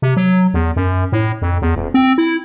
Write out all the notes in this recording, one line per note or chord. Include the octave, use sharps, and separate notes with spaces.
C3
F#3
E2
F#2
A2
F2
E2
D#1
C4
E4